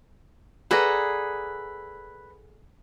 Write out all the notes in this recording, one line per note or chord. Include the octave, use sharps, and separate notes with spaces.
G#4 A4 B4 D5 F#5 A#5